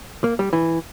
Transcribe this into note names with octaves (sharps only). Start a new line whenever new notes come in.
A#3
G3
E3